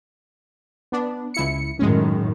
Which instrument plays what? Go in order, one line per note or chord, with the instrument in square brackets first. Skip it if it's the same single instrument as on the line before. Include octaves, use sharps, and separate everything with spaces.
[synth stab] B3 D4
C#2 E4 C#7
[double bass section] F#2 A2 D#3 [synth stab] G#3 C#4